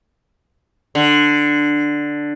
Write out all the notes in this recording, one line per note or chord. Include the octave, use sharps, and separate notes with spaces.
D3